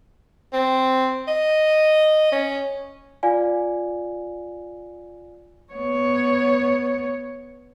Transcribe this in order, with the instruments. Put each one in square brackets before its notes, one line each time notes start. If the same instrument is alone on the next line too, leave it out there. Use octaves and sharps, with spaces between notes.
[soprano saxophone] C4
D#5
C#4
[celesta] F4 D5 F5 G#5
[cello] B3 C#5